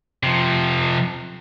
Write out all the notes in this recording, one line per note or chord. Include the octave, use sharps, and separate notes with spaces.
C3 F3